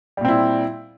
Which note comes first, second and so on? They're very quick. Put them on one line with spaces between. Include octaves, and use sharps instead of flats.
G3 A#2 C4 E4